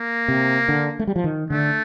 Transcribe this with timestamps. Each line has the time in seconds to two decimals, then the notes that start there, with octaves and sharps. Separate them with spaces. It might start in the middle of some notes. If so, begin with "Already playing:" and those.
Already playing: A#3
0.28 C3
0.69 D3
0.99 A3
1.07 G3
1.16 F3
1.24 D#3
1.50 D3 A3